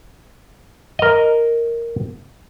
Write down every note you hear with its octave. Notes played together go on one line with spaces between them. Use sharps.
A#4 D#5